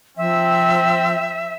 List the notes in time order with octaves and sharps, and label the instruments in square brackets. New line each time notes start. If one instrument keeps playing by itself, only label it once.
[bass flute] F3 [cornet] C4 [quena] E5